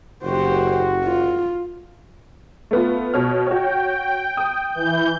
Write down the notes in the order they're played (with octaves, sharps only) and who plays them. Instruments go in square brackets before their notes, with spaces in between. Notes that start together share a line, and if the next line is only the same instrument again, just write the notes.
[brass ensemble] F#1 F#4 [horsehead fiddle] G4 C5
[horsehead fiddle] F4
[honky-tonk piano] A3 B3 F4
B2 C#5 F6
[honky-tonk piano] F#4 C#5 [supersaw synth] G5
[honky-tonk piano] D#6
[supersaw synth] E3 G6